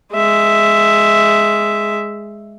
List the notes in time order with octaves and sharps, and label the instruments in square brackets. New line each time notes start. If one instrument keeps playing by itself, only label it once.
[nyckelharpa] G#3 E5